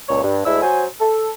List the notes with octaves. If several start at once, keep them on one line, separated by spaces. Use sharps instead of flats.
C#2 A#2 C#5
G2
D2 D3 G#3 E4 E5 E6
F#3 C5 G#5
A4